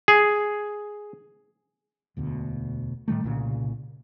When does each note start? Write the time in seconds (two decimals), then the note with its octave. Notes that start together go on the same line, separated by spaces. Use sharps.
0.08 G#4
2.17 E1 D2 B2
3.08 A2 D#3 G3 A3
3.24 C2 A#2 C#3